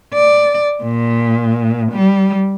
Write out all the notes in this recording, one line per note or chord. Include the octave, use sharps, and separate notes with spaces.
D5
A#2
G3